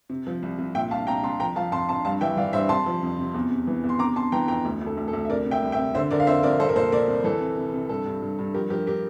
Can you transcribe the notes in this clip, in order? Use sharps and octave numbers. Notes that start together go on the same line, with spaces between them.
C3
F3
C2
C2
A#2 E5 G5
C2 F5 A5
C2 G5 A#5
C2 A5 C6
F3 G5 A#5
F3 F5 A5
F2 A5 C6
F2 A5 C6
G2 F5 A5
E3 E5 G5
E3 D5 F5
G2 C5 E5
C3 A5 C6
F3
F2
C3
E2
C3
E3
E2
C6
C3 A#5 D6
C3 A5 C6
E3 G5 A#5
F2 G5 A#5
D2
D2
A4
D2
A4
D2
E5
C3 A#4 D5
C3
E5 G5
C2
E5 G5
C3
D3 C5 E5
D3 A#4 D5
F5
F2 C5 E5
F2 A#4 D5
C2 A4 C5
A#4
A#2 A4 C5
A#2 A#4 D5
C2
E3 A4
C3
C3
C3
G2 A4
G2
G2
G2
F3 G4 A#4
F3 G4 A#4
G4 A#4